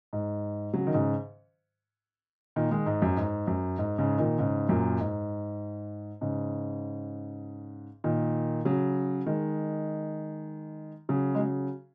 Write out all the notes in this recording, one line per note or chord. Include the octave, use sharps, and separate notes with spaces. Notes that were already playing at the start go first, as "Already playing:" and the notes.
G#2
C#3 F#3
D#3
G#2 C#3
A#2 D#3
D#3 G#3
G#2
F#2
G#2
F#2
G#2
G#2 C#3
A#2 D#3
G#2 C#3
F#2 A#2
G#2
G#2 C#3
A#2 D#3
C#3 F#3
D#3 G#3
C#3 F#3
G#3
C#3 F#3